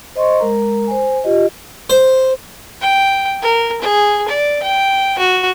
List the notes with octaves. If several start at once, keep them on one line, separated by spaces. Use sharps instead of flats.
C5 D#5 C6 C#6
G#3 A#4 A#5
C5 G#5
F4 G4 D#5
C5
G5
A#4
G#4
D5
G5
F#4